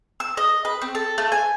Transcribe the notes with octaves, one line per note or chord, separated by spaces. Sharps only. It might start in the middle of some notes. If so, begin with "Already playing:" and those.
E6
D#5
B4
C4
A4
A3
G#5